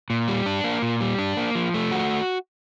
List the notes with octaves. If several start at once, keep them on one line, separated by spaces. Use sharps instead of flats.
A#2
G3
D4
A#3
A#2
G3
D4
A#3
F3
A3
F#4